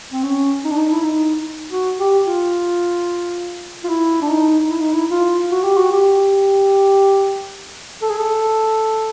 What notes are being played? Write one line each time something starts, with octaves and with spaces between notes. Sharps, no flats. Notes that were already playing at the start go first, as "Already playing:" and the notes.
C4
C#4
D#4
D4
D#4
E4
D#4
F#4
G4
F4
F4
E4
D4
D#4
E4
D#4
E4
F4
F#4
G4
F#4
G4
A4
G#4
A4